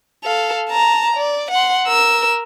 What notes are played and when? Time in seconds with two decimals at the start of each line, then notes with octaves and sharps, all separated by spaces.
0.24 A4 F5
0.69 A5 A#5
1.17 D5
1.51 F#5 C6
1.87 A#4 E6